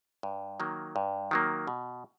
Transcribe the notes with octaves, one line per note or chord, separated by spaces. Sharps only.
G2
D#3 F#3 A#3
G2
D#3 F#3 A#3
B2